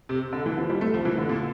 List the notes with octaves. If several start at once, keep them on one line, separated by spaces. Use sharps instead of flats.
C3
D3
E3
F3
G3
A3
F3
E3
D3
A#2